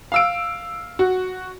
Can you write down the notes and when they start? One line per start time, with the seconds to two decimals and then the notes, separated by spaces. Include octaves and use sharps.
0.12 F5 E6 D7
0.99 F#4